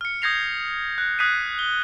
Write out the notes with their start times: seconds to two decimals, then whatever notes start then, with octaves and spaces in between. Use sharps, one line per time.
0.01 F6 C#7
0.22 D#6 G6 G#6 A#6 C7 F7
0.98 F#6
1.19 D#6 F#6 G#6 B6 C7 D#7
1.59 G7